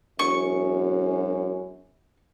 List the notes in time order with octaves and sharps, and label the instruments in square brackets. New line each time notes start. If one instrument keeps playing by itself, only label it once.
[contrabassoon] E1 [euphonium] F#2 [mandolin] C#6